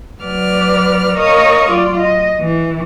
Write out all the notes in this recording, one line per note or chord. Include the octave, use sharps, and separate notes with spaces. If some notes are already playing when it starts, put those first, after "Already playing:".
F#3 B4 D5 F6
A#4 C#5 D#5 F5 C#6 D#6
F#3 F4 D5
D#5
E3